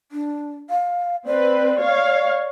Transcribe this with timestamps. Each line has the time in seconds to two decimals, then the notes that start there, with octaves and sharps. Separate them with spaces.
0.12 D4
0.70 F5
1.26 C4 B4 D5
1.80 C#5 F5